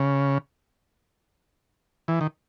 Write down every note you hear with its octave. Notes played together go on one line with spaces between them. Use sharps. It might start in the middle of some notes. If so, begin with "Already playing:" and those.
Already playing: C#3
E3
D#3